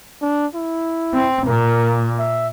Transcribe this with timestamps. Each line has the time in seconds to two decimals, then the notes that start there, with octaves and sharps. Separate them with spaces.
0.22 D4
0.55 E4
1.14 C4
1.47 A#2 A#4
2.19 E5